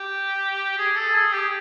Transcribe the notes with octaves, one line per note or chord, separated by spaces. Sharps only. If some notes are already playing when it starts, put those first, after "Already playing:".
Already playing: G4
G#4
A4
G#4
G4